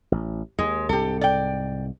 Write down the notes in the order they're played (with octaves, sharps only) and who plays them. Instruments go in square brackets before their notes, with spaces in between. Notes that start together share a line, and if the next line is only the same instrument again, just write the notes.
[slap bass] A1
[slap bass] D#2 [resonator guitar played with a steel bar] G#3
[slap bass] C2 G#2 [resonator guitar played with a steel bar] G4 A4
[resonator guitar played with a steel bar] D5 G5